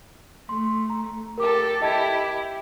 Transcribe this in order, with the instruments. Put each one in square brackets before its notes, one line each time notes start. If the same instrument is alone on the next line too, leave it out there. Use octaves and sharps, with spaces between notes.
[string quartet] A3 [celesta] C6
[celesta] A#5
[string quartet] G4 A4 [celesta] A#4 D6
[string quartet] E4 G4 [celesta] D#5 A5 G#6